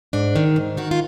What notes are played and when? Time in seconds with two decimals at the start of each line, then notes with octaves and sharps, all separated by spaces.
0.13 G#2 D4
0.36 D#3
0.56 G#2
0.77 D#3 F#4
0.91 F4